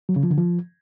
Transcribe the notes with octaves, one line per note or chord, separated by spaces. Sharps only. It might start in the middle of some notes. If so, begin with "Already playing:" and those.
F#3
C#3
F3
D3
F3